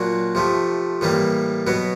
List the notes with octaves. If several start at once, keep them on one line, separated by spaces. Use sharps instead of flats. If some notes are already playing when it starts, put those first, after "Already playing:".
Already playing: A#2 F#3 A#3 D4 F#4
C3 F3 A3
A2 E3 G3 A#3
B2 F#3 B3